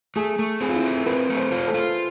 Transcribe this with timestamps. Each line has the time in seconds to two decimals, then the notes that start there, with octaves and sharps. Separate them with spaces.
0.16 A3 G#4
0.39 A3
0.61 C4 G#4
0.69 F4
0.76 E4
0.83 A3
1.06 C4 B4
1.30 A3
1.37 C5
1.51 F4
1.67 A4
1.74 F4